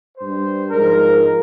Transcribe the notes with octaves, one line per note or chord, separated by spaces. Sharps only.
G2 G3 C5
G#2 F3 G#3 A#4